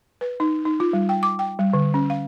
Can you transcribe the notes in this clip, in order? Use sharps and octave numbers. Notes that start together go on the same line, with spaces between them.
B4
D#4
D#4
F4
G3
G5
D6
G5
G3
D3
C#4
F5